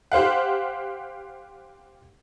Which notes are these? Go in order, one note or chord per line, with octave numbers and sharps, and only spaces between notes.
G4 C5 F5 F#5